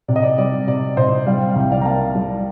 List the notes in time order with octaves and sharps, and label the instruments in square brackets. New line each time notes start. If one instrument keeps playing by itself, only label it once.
[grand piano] C3 D5
D#5
D5
G3 D5
C3 D5
C3 C5 D#5
G3 F5
G5
F5
C2 G5
D5 F5
A#5
A#3 F5 A5
G3